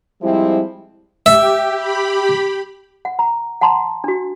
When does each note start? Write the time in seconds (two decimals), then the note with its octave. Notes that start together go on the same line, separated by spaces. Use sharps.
0.22 F3 G3 G#3 C4 E4
1.26 G4 E5
1.76 G4 B5
3.05 F#5
3.19 A#5
3.61 F#5 A5 A#5 C6
4.04 D4 F#4